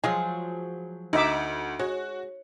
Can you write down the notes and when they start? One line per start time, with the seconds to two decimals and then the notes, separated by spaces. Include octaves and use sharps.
0.04 F3 F#3 G#3 F4 G#4
1.13 D2 D#4 E5 D6
1.79 G#3 F#4 C#5